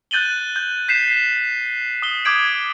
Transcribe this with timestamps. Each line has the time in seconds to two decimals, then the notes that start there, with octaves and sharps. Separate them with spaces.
0.11 F#6 G6 A6 D#7 F#7 G7
0.56 G6
0.88 G6 B6 C7 E7
2.02 D#6 G7
2.25 D6 D#6 G6 G#6 D7 F#7